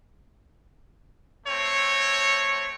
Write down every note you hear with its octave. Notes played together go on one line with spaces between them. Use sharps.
A3 C4 C#5